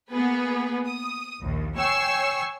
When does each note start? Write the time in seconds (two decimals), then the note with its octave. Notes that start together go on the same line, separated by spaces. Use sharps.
0.10 A#3 B3 G#4 B4
0.86 D#6
1.41 A#1 D#2
1.77 C#5 G5 G#5 C#6 E6 C7